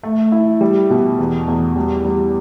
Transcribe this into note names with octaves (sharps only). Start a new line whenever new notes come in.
A3
E4
G3
B2
E2
E2
G3
G3